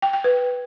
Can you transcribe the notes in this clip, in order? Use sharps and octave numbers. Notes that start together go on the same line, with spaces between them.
G5
G5
B4